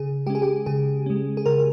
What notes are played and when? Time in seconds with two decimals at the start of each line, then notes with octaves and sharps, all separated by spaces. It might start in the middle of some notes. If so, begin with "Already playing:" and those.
Already playing: C#3 G#4
0.27 G#3 C#4 G4
0.35 G#4
0.42 G4
0.66 C#3 G#4
1.06 G#3 C#4
1.37 G#4
1.46 C#3 A#4